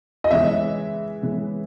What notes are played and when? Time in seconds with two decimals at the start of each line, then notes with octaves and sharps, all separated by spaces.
0.24 D#5
0.31 C#3 E3 G#3 E5
1.22 C#3 E3 G#3